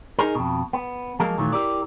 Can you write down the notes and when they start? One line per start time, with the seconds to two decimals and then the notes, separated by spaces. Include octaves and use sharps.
0.19 D#4 G#4 A#4
0.35 F2 B2
0.73 B3
1.20 F3 F#3 G#3 A#3 A#4
1.38 A#2 D#3 E3 F#3 A3
1.52 E4 G4 A#4 D5